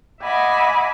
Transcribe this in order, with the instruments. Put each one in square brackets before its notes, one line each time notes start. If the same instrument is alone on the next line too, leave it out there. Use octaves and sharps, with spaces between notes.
[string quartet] D#5 E5 F#5 G#5 B5 D6